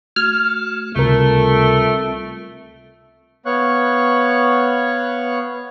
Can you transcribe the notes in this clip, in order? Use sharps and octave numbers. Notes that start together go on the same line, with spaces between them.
A3 F#4 F6 G#6
C#2 C3 G3 A3 C4 F4 A#4
B3 C#5 F5 C#6 F#6